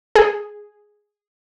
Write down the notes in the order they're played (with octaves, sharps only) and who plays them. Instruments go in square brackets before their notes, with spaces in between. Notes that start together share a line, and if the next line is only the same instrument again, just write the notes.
[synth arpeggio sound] G#4